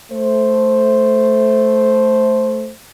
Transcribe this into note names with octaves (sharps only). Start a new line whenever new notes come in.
A3 C5